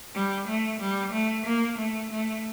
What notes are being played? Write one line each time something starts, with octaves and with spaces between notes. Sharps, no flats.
G3
A3
G3
A3
A#3
A3
A3